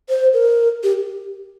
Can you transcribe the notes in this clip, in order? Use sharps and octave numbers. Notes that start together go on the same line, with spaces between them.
C5
A#4
G4